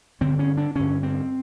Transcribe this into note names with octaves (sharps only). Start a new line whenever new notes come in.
G2 D3 C4
C#4
D4
G2 D3 C#4
C4